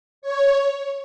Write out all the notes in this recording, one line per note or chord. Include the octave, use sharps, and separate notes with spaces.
C#5